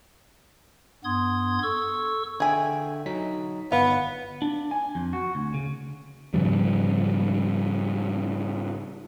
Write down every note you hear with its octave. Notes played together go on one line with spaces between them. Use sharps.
G2 B3 C6 D#6 G#6
A4 C#6 E6
D3 G#4 E5 G5 G#5
F#3 D#4 B6
G1 B3 F5
D4
G#5
F2
F#4
D2
C#3
G#2 C#3 F3 G3